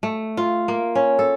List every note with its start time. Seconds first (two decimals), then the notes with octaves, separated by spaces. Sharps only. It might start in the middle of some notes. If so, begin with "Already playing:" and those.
0.03 A3
0.37 F4
0.68 A#3
0.95 C#4
1.19 A4